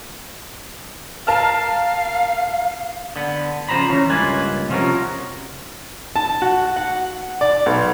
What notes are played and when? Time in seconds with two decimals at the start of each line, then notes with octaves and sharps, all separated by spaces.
1.27 A#4 F5 A5 F6
3.16 D3 B3
3.69 C#3 F3 C5 A#5 B5
3.90 E3 C#4
4.09 C#2 G2 A#3 F4 B4 G#5
4.69 C3 F3 C#4 F#4 A#4
6.16 A5
6.42 F#4
6.76 F#5
7.41 D5
7.66 B1